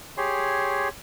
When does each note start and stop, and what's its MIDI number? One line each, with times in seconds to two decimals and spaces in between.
0.18 0.89 67
0.18 0.89 68
0.18 0.89 73
0.18 0.89 84